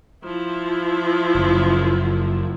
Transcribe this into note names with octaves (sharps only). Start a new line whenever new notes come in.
F3 E4
F#1